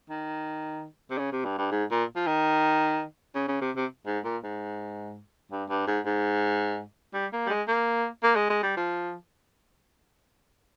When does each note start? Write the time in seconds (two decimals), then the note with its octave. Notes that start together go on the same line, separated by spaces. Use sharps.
0.10 D#3
1.10 C3
1.18 C#3
1.32 C3
1.44 G2
1.58 G2
1.72 G#2
1.91 A#2
2.16 F3
2.27 D#3
3.35 C#3
3.48 C#3
3.61 C3
3.76 C3
4.06 G#2
4.24 A#2
4.43 G#2
5.51 G2
5.69 G2
5.87 G#2
6.05 G#2
7.14 G3
7.32 A#3
7.46 G3
7.50 G#3
7.68 A#3
8.23 A#3
8.36 G#3
8.50 G#3
8.63 G3
8.76 F3